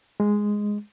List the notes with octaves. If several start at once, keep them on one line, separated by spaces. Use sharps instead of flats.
G#3